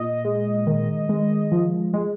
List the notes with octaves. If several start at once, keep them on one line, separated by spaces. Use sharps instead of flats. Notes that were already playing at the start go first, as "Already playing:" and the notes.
Already playing: A#2 D#5
G#3
D#3
G#3
F3
G#3